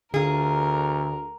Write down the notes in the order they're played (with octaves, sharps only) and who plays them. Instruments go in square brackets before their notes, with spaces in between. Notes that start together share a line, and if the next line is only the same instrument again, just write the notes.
[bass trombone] D2 [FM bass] D3 [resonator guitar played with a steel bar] F4 G#4 [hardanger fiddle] A#4